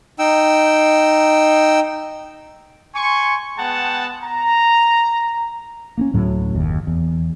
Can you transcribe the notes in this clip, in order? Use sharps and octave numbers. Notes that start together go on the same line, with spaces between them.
D#4 G5 E6
G#5 C6 C#6
G#3 B3 F#5 G5 A5
A#5
A#3 C4 C#4
D2 A2 F#3
F#1 D#2
E2